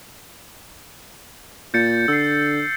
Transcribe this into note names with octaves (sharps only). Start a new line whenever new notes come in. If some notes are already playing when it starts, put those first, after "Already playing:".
A#2 G6 A6 C#7
D3 E6 C7